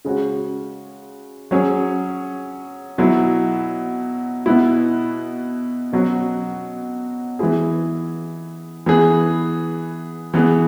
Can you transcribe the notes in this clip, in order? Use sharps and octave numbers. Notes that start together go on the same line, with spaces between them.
C#3 G#3 C#4 F#4
F#3 C#4 G#4
B2 F#3 E4
B2 B3 E4
B2 F#3 C#4 F#4
E3 B3 E4 G#4
E3 B3 G#4
E3 B3 G#4